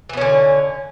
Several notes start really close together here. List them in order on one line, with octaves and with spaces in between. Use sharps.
E3 B3 C#4 D3